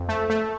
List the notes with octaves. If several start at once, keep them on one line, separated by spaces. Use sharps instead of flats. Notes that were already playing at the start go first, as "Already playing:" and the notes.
Already playing: F2
A3
A3